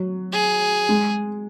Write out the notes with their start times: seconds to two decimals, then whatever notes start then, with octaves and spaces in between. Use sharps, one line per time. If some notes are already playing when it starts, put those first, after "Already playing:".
Already playing: F#3
0.32 G#4
0.89 G#3